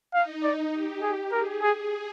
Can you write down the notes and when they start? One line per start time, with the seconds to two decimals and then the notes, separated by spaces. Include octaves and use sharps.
0.13 D#4 F5
0.43 D5
0.73 G4
1.02 G#4
1.32 G#4 A#4
1.62 G#4